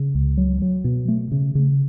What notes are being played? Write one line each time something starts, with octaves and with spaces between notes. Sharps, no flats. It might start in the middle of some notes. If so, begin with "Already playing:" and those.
Already playing: C#3
C#2
F#3
F#3
B2
A3
C#3
C#3